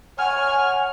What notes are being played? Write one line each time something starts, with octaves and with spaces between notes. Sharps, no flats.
C#5 F#5 G#5 F6